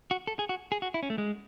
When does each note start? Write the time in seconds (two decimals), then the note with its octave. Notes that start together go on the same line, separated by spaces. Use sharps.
0.11 F#4
0.27 A4
0.39 G#4
0.49 F#4
0.72 G#4
0.82 F#4
0.94 E4
1.03 C#4
1.10 A3
1.18 G#3